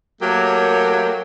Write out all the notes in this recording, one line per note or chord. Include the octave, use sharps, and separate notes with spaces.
F#3 A3 A#3 G4 A#4 C#5